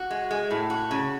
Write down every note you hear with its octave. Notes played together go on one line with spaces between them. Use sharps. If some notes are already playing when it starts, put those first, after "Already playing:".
Already playing: F#4
G#3
G#3
A2
F#4
C#3